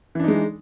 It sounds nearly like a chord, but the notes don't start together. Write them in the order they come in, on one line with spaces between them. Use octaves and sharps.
E3 D4 D#4 G#3